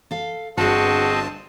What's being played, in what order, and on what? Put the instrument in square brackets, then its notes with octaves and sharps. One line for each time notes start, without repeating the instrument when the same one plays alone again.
[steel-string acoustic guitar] A4 F5
[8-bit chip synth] G1 G2 A5 [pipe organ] C4 D#5 [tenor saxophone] F#4 [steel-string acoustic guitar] G#4 B4